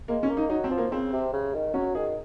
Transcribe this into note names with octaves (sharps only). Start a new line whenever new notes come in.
G#3 A#3
C#4
A#3
D#4
F#3 D#4
C4
F3
A#3
C#3 C4
C3
C#3
D#3
F#3 C#4
D#3 G#4